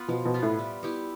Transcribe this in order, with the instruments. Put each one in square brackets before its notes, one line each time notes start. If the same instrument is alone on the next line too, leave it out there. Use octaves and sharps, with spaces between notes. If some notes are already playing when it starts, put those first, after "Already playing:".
Already playing: [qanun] B3 F4 B4
[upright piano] B2 [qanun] F3
[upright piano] B2
[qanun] B3 F4 B4
[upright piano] A2
[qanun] G3
B3 E4 G4